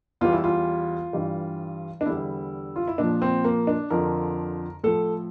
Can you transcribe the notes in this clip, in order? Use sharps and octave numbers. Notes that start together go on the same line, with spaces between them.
E2 E3 G3 F4
E4
F4
G2 E3 G3
D4
E2 D3 G3 E4
F4
E4
A#2 F3 D4
C4
A#3
D4
F2 D3 F3 A#4
A2 F3 A4